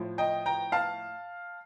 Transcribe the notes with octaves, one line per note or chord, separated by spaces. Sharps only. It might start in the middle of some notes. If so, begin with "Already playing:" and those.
Already playing: A2 F3
D#5 G5
G5 A#5
F5 A5